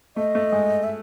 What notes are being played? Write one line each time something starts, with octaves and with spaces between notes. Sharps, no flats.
A3 D#5
A3
G#3
E5